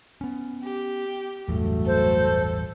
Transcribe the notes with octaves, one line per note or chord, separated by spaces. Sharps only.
B3 C#4
G4
A1 E2 G2 F#3 A3
A4 C5